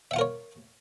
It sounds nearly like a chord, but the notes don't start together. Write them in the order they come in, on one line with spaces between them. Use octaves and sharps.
E5 F#5 F4 A#4 C#5